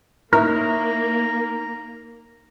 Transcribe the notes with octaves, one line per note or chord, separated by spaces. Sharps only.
A#3 D#4 E4 A#4 C#5 A#5